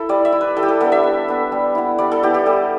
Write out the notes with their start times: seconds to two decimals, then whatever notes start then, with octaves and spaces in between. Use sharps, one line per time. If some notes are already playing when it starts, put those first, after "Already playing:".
Already playing: E4 A4
0.09 G3 D5
0.25 E5
0.32 E4
0.41 B4
0.57 G3 A4
0.63 G4
0.68 A4
0.81 B3 D4 A4
0.92 E5
1.04 G3
1.28 B3 D4
1.52 G3
1.75 B3 E4
1.98 G3 D5
2.12 A4
2.23 B3 E4 G4
2.34 G4
2.46 G3 A4